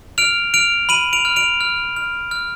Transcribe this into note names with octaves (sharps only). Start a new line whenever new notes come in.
F6 D7 F7
F6 D7 F7
B5 D#7 F#7
D7 F7
F6
D7 F7
F6
F6
F6